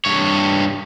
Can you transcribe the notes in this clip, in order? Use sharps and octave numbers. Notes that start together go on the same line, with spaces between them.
G2 C#5